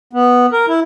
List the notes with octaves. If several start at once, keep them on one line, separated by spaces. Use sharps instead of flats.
B3
A#4
E4